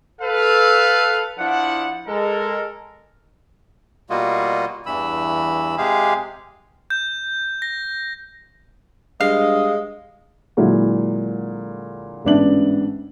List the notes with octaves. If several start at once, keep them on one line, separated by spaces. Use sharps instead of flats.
A4 B4 F5
F3 D4 E4 F#5
G#3 A4 A#4
B2 G3 A#3 F4 F#4 D#5
E2 G2 E3 B5 E6
C3 G#3 G4 G#4 F5
G6
A#6
G2 G#3 D#5 F5
A#2 D3 F#3 G#3 E4
A1 G#2 B3 D4 E5 F#7